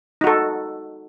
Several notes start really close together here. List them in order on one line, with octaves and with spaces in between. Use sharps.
D#4 F#4 A4